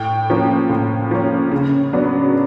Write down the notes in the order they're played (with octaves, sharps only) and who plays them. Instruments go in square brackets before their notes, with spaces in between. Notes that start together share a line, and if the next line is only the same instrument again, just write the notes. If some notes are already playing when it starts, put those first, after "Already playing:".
Already playing: [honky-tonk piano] A2 G5
F3 A#3 C#4
A2
F3 A#3 C#4
C#3
F#3 B3 D4